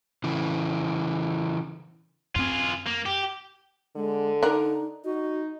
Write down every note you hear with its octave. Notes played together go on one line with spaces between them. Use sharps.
C#3 E3
F#2 C4 F4 G#4
A#3
G4
D3 G#3
D4 D#4 A#4
D#4 F#4